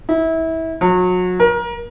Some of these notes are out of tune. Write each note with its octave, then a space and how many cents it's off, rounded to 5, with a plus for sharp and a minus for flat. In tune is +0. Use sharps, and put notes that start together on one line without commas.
E4 -25
F#3 -30
A#4 +30